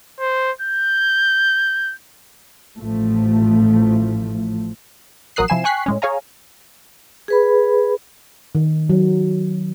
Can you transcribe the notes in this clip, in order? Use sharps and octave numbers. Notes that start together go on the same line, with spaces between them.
C5
G6
A1 A2 F3 A3
A#1 F#3 A#4 D#6 F#6 C7
C3 F3 E4 G#5 C7 E7
G5 G#5 C#6 F#6 B6 C7
A2 G#3 C#4
G#4 C#5 F5 G#5 A#5
G#4 B4 B5
D#3
F#3